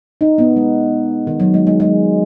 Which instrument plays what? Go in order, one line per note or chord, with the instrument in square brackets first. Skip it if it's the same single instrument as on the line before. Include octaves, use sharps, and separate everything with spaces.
[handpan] D#4
B3
G#3
D#3
F#3
G#3
G#3
G#3